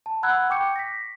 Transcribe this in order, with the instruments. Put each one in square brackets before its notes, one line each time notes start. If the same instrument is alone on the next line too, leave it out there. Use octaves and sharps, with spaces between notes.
[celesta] A5
F#5 A#5 B5 E6 F#6 G#6
G5 C#6 D6 G6 C#7
A#6 B6